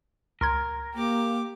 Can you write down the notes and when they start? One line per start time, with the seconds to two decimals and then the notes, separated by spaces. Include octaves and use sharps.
0.41 C#2 A#4 C6 G#6
0.95 A#3 G4 D6